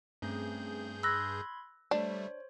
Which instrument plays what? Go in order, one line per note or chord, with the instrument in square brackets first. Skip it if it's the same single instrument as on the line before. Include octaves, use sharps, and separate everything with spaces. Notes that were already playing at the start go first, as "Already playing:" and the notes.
[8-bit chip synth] G2 G#4 G6 [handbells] A3 C4 C#4
[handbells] B5 C6 G#6 [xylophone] E6 F#6 A#6
[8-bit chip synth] G3 A3 [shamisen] D4 [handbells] C5 C#5